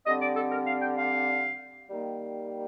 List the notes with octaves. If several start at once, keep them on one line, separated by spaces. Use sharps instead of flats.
D3 G3 C4 D#5
D5
A4
A#4
F5
G5
F5
D#3 G3 A#3